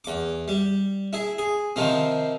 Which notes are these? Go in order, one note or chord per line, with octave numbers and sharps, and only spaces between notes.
E2 D6
G3
E4 G#4
G#4
C3 D#3 F3 C4